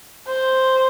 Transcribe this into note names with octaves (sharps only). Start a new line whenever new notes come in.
C5